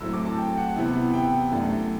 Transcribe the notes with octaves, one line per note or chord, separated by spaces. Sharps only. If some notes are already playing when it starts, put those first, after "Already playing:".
A2 F#3 A3 C4 E6
D6
A5
G5
F#5
C3 E3 B3 E4
G5
F#2 E3 A3 D4